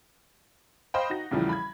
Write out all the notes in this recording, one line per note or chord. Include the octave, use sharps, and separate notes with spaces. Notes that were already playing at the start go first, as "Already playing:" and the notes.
C5 D#5 F5 G5 B5
D#4 F#4 A#6
E2 A2 C#3 E3 F3 G3
B5 G#6